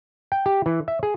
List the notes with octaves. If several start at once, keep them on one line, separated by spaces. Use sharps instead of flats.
G5
G4
E3
E5
G#4